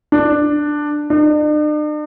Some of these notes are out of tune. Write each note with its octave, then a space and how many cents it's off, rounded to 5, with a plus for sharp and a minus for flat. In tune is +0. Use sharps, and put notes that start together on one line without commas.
D4 +10
D4 +45